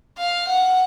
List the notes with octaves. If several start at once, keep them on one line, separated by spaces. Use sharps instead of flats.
F5
F#5